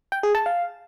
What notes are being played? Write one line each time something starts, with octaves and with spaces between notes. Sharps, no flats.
G5
G#4
A5
F5